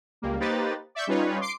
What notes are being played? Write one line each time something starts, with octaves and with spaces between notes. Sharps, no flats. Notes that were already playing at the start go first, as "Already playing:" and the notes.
C#2 G3 A#3
A#3 D#4 G4 B4 C5 A6
D5 E5 C#6 G6
G3 C#4 D#4 F4 B4 C#5
C6 D6 C7 D7